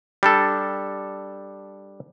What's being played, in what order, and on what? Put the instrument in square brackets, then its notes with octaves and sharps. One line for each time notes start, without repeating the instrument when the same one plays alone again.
[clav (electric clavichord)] G3 D4 A4